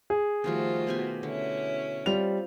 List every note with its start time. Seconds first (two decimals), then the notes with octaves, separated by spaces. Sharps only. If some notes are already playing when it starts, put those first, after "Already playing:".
0.10 G#4
0.44 D#3 F3 G3 A3 F4 F#4
0.87 B2 G4 G#5
1.23 D3 C#4 E4 C#5
2.06 G3 C4 F4 F7